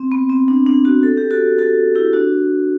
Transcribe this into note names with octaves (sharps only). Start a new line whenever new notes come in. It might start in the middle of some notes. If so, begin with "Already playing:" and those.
Already playing: C4
B3
C4
D4
D4
D4 F#4
A4
G4
F#4 A4
F#4 A4
E4 G4
D4 F#4